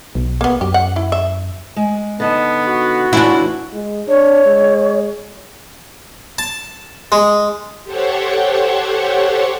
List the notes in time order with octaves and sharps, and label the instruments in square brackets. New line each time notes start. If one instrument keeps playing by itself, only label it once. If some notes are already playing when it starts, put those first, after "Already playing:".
[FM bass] B1
[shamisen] A#3 B3
[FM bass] F#2 [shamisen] G4
[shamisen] F#5
E4
E5
[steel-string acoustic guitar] G#3
[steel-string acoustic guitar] D3 D#4 A5 [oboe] B3
[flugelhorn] F#4
[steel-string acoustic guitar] E2 F4 F#5 [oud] D4 E4
[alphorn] G#3
[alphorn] D4 [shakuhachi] C#5
[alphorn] G#3
[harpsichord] A5
G#3
[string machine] G4 A4 C5 C#5 F#5 C#6